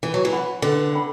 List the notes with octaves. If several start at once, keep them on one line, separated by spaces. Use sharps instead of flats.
E3 B4
F#3
E3
F#5 B5
D3 B4
F#5 B5